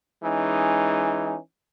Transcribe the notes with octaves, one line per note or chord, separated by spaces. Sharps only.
E3 G#3 C#4 D#4